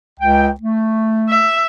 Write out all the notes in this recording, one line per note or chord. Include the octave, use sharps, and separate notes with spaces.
C#2 G5
A3
E5